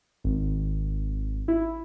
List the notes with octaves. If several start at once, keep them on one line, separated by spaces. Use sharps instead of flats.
G#1
E4